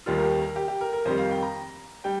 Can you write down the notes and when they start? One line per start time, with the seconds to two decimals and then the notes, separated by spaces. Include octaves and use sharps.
0.06 D#2 D#3 G3 F4
0.18 A#4
0.23 G4
0.40 A#4
0.56 G4
0.68 G4
0.81 A#4
0.93 A#4
1.05 F2 D#3 G3 C5
1.18 F5
1.31 G5
1.43 A#5
2.04 G3 G5